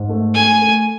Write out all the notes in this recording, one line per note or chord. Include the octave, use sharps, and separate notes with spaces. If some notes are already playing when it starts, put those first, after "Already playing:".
Already playing: G#2
A3
A3 G#5
A3